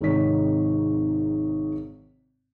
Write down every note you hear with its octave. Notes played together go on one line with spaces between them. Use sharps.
G#1 G#2 C3 D#3 C#5 B6